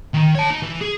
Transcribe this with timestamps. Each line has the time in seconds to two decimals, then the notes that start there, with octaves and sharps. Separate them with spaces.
0.14 D#3
0.35 C#5 A5
0.50 D#4
0.62 E3
0.81 G#4